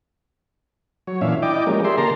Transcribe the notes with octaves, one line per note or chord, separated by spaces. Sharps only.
F#3 C#5
A#2 E3 C#4 D4 E5 F5
E4 D5 D#5 G5 D6
F3 G#3 A#3 C#4 G4 A#4
G4 G#4 A#4 D5 E5 C6
D3 A#3 A#4 A5 A#5 C6